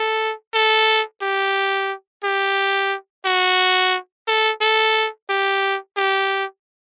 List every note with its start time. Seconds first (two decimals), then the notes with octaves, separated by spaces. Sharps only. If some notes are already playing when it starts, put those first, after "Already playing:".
Already playing: A4
0.54 A4
1.22 G4
2.24 G4
3.25 F#4
4.28 A4
4.61 A4
5.29 G4
5.97 G4